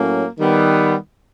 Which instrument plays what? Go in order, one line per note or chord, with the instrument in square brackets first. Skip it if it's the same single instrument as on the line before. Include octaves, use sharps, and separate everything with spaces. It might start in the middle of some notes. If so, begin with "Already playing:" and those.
Already playing: [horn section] A2 F#3 A#3 C#4
D#3 G3 B3